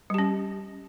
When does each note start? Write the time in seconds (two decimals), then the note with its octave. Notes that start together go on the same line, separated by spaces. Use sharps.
0.10 G3
0.14 G4
0.18 C#4